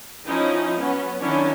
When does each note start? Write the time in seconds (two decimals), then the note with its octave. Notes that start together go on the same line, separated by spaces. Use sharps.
0.25 F3 C#4 D#4 E4
0.78 F#3 B3 C#4
1.19 D#3 F#3 C#4 D4 E4 C#5